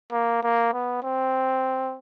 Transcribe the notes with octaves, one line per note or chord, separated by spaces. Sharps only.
A#3
A#3
B3
C4